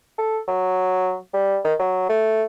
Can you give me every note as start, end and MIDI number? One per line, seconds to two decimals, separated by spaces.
0.18 0.40 69
0.48 1.16 54
1.33 1.59 55
1.65 1.74 51
1.79 2.05 54
2.09 2.44 57